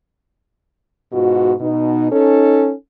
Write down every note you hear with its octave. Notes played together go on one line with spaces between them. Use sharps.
G#2 B2 F4 F#4
B2 D#4
C#4 D#4 A4